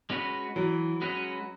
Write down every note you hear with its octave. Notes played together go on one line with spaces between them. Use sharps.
G#3 C#4 F#4 B4
E3 F#3
G#3 C#4 F#4 B4